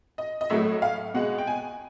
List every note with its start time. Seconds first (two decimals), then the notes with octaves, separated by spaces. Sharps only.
0.18 D#5
0.41 D#5
0.50 A2 F#3 A3 E5
0.82 F5
1.14 B2 G#3 F#5
1.38 G5
1.47 G#5